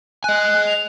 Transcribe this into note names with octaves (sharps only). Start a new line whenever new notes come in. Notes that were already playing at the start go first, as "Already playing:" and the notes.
D#5 G#5 F#6
F7